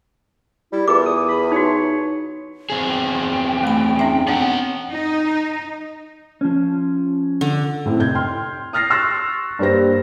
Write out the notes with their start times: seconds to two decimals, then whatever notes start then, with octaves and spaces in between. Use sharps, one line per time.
0.73 G3 E4
0.88 E2 F4 G#4 A#4 D6
1.06 D#6
1.28 B5
1.52 D#4 F#4 C#5
2.70 E2 C4 G#4
2.88 G5
3.63 A3 B5
3.99 C#4 D#4 E5
4.28 B3 C4 D4 C#5 F#5
4.89 D#4
6.41 F3 C#4
7.41 D3
7.86 A2 C4
7.99 F1 G6 G#6
8.15 G5 C6 F6
8.73 D#6 F6 A6 A#6 C7
8.90 C6 C#6 E6 F#6 A6 A#6
9.59 G2 A#3 G4 C5 A#6